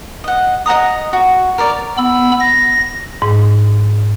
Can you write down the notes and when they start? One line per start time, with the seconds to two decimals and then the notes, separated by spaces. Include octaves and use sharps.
0.24 D#5 F#5
0.66 D#5 F#5 A#5 D#6
1.13 F#4
1.58 A#4 C#5 D5
1.98 B3 B5 E6
2.40 A#6
3.22 G#2